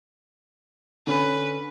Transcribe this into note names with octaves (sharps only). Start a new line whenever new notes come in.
D3 C#4 B4